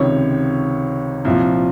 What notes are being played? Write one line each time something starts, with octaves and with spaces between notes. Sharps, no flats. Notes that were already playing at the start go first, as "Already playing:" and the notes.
Already playing: C#2 C3 D#3 C#5 C#6
C2 A#2 F3